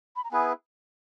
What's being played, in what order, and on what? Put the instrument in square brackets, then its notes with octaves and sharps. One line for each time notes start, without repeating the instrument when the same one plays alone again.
[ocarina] B5
A#5
[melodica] B3 E4 G#4 B4 [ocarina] G#5